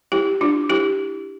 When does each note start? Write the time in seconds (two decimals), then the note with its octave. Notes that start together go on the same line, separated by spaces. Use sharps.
0.12 E4 G4
0.41 D4 F4
0.70 E4 G4